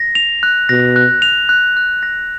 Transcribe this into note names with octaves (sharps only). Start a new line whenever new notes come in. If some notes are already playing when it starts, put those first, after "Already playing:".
Already playing: A#6
F7
F#6
B2 A#6
F#6
F7
F#6
F#6
A#6